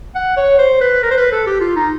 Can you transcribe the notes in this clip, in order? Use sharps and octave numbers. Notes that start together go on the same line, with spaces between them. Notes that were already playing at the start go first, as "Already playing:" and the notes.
F#5
C#5
C5
B4
A#4
C5
B4
A4
G4
F4
D#4